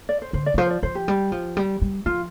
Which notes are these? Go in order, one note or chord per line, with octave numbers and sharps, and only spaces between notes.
D5
C5
D3 C5
D5
D3
F3 C5
D5
F3 C5
G4
G3
F3
G3
G3
F3 F4